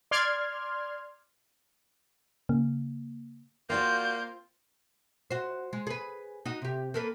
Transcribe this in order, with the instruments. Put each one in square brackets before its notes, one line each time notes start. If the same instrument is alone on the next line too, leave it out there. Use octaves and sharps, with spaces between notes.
[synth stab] D5 C6 F6 G#6
[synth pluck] C#3 A#3
[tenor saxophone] A#3 [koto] C4 F4 [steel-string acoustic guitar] F#4 D5 F5 [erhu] G6
[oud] F#4 C5
G#3
G#4 B4
D#4 F#4
C3 G4
A#3 A4 B4